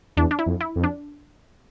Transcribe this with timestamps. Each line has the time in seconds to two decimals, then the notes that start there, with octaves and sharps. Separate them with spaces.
0.17 E2 D4
0.31 D4
0.39 E4
0.46 F2
0.61 E4
0.76 F2
0.84 D4